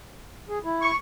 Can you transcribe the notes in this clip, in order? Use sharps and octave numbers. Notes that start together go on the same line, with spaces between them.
G#4
E4
C#6